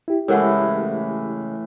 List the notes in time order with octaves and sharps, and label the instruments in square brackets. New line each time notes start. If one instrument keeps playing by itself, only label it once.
[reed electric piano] E4 G4
[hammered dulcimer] A2 E3 [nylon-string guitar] C#3 G#3 A3 [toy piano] A4 A#4 F#5